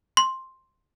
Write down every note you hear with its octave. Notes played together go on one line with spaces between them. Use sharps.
C6